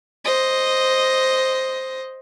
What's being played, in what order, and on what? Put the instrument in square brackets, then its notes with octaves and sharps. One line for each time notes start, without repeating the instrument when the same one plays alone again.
[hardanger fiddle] C5 D#5